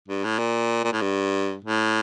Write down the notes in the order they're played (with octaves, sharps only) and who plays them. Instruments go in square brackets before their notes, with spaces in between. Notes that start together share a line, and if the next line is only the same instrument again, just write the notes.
[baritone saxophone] G2
A2
A#2
A#2
A2
G2
A2